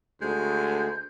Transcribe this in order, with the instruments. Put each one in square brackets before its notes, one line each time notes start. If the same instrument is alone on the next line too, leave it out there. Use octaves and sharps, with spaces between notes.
[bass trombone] D2 [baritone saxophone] G#3 [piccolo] G6